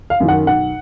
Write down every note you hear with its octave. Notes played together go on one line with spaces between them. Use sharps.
F5
F#2 D#3
F#5
B1 F#5